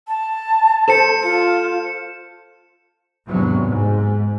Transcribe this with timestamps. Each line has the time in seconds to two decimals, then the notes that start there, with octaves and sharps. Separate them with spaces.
0.08 A5
0.88 A4 C5 C#7 E7
1.23 F4 C#7
3.27 G#1 E2 G2 C3 F#3
3.66 G#2